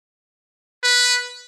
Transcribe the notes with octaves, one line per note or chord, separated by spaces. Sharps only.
B4